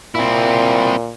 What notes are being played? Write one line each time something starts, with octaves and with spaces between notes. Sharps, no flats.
A#2 C4 E4